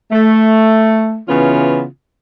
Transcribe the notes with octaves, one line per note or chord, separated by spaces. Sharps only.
A3
C#3 E3 B3 C#4 F4